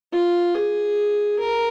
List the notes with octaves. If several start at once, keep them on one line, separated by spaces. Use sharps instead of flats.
F4
G#4
A#4